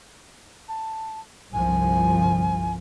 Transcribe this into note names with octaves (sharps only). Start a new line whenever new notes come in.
A5
G1 C2 F3 G#5